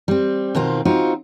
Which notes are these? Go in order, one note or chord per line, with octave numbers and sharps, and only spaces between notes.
G3 C4
B2 D#3 C4 F4
C4 D#4 F4 F#4